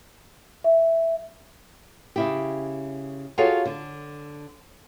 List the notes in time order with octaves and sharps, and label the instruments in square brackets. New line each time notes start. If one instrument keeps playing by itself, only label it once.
[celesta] E5
[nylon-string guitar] C#3 E4 G4
F4 F#4 G#4 A4 C#5 F5
D3